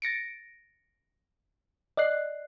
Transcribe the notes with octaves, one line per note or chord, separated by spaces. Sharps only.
A6 A#6 C#7 D7
D5 D#5 F#6 C7